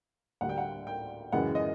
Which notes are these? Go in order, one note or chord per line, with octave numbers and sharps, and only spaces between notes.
D2 D3 G3 F#5
G5
F#5
G5
F#2 C#3 E3 G#3 F#5
D#5